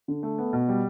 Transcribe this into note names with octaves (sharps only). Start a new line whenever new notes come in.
D3
A3
B3
B2
G3